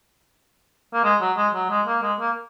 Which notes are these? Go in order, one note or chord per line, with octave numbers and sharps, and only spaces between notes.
A#3
G#3
F#3
G#3
F#3
G#3
A#3
G#3
A#3